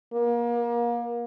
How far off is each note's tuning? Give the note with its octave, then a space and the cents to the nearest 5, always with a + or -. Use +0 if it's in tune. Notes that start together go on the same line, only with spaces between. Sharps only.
A#3 +30